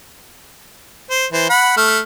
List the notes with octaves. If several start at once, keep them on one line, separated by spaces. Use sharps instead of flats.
C5
E3 C5
F#5 B5
A3 F6